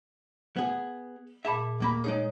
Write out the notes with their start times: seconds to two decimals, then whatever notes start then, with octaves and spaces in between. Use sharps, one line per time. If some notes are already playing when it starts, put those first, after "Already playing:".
0.56 B3 G#4
1.45 A#2 G#4 E5 A5 B5
1.80 D#2 A#3 B5
2.04 G#3 D#4 G#4 C#5